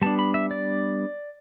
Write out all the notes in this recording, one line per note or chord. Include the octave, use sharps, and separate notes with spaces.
G3 B3 D4 A5
B5
E5
D5